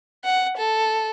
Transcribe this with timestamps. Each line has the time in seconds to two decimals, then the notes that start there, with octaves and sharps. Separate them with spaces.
0.24 F#5
0.57 A4